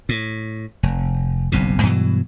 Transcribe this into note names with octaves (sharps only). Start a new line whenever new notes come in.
A2
F1
F#1 B1 G2 C3
G2 B2 E3 F#3